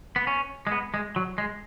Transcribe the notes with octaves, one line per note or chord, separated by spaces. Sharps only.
B3
C#4
G#3
B3
G#3
F#3
G#3